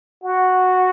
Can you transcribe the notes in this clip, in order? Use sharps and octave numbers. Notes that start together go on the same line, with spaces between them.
F#4